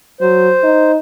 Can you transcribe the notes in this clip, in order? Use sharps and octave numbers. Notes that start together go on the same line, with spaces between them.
F#3 C5
D#4